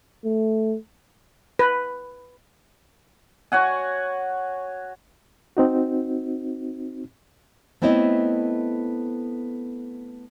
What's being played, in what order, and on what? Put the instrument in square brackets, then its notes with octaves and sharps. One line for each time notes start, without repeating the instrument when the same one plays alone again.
[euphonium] A3
[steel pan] B4
[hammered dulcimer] F#4 C#5 F#5 G#5
[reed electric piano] C4 D#4 F#4
[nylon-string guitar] A3 B3 C4 E4 C#5 D#5